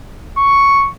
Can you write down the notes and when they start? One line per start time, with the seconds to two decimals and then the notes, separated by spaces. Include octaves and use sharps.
0.38 C#6